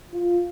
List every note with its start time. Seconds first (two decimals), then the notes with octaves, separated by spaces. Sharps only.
0.11 F4